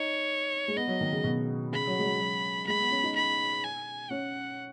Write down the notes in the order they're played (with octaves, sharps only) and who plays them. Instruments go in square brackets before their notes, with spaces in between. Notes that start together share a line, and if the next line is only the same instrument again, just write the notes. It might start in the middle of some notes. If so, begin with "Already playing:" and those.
Already playing: [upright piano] D#4 [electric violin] C#5
[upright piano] G#3
[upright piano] B3 [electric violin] D#5
[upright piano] F#3
D#3
C#3
B2
[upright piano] C#3 [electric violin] B5
[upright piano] F#3
G#3
F#3
F#3
[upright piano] G#3 [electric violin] B5
[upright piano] B3
C#4
D#4
[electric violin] B5
G#5
[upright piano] C#4 [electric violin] F#5